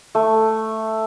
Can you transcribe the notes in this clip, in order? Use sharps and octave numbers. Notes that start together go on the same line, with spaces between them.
A3